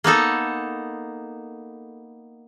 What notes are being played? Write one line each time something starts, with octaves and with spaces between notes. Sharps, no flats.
A#3 B3 D#4 A4